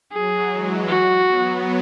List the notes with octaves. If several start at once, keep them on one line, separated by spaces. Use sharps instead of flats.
F#3 G#4
E3 G#3
F#4
F#3 B3